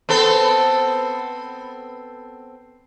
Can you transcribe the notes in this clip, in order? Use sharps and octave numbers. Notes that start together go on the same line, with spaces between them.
B3 C4 A4